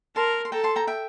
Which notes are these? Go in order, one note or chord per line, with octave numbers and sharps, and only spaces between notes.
A#4 A5 C6
C6
A4 G5 A#5
A5 C6
G5 A#5
E5 G5